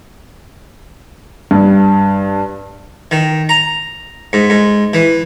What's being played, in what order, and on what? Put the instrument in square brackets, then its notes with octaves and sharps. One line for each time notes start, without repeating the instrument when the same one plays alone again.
[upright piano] G2
[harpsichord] D#3
A#5
G#2
G#2
E3